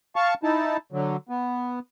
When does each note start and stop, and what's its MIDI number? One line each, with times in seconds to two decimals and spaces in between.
0.16 0.34 77
0.16 0.34 81
0.16 0.34 85
0.43 0.77 63
0.43 0.77 64
0.43 0.77 81
0.92 1.16 50
0.92 1.16 54
1.29 1.79 59